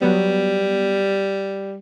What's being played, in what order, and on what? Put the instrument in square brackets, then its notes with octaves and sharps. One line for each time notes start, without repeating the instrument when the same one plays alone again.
[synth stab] F#3 B3 [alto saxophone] G3